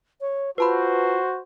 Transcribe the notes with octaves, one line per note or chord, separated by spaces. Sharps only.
C#5
F4 F#4 B4 C5 A5 B5